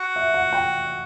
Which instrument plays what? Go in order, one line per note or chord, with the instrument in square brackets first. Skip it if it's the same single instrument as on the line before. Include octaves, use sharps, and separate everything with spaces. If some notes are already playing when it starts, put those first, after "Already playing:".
Already playing: [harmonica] F#4
[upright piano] E5
F#5
G5